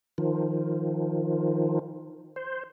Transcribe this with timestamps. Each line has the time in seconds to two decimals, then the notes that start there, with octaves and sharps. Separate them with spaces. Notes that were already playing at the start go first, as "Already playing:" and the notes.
0.18 D#3 F3
2.36 C5